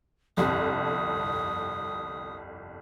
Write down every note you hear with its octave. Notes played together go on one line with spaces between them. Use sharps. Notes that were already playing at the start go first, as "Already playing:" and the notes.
G1 C2 F2 D#6